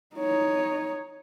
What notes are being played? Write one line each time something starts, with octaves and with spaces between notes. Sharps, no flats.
D#4 C#5